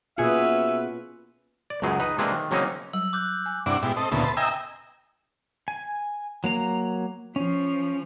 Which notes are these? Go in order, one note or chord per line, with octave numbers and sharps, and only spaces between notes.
B2 A#3 C#4 F4 G#4 B4 E5 F#5
D5
C#2 F#2 C#3 F#3 G#4
D#4 B4
C3 G#3 A#3 C4 D4 B4
D#3
C#3 F#3 A#3 C4 C#4 D#4
F#3 G3 E6 F#7
D6 F#6 G6
G#5
G2 C3 D4 E4 F#5 D6
G#2 B2 E4 G4
C4 A4 D#5
D2 A#2 C#3 B3 E4 A4
B4 C5 A5
D#5 E5 G5 G#5 A#5 E6
G#5
F#3 A#3 A#5
F3 C#4